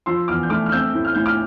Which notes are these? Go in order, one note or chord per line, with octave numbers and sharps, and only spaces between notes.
F3 C6 E6
E2 D6 F6
G6
A3 D6 F6
F6
C4 E6 G6
A2
F6
A2 G6
D6 F6